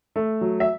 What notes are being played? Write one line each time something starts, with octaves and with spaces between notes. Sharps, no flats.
A3
F#3
E5